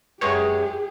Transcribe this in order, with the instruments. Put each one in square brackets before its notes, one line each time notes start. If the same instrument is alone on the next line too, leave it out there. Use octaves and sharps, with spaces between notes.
[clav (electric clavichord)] F#2 G#3 C#5 [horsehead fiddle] G4 G#4 [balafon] B4 C#6